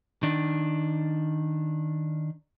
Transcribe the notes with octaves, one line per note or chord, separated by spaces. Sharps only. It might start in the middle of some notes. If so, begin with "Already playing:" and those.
D#3 D4